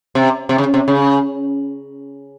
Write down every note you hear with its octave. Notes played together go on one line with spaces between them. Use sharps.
C3
C3
C#3
C3
C#3